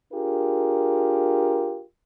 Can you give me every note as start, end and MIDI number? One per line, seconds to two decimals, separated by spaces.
0.13 1.83 62
0.13 1.83 65
0.13 1.83 67
0.13 1.83 68
0.13 1.83 70